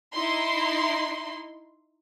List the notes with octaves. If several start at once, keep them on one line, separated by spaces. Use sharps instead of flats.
D#4 E4 C6